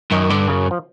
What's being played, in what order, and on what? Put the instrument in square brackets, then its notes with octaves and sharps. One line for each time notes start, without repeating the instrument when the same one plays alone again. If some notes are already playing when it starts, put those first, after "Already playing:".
[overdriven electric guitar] F#2 [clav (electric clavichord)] D#3
[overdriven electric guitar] G2 [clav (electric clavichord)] D3
[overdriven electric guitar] F#2 [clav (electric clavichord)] C#3
[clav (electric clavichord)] F3